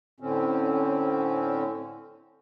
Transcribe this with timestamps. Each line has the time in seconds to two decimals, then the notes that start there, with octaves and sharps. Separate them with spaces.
0.20 A2 D3 C4 C#4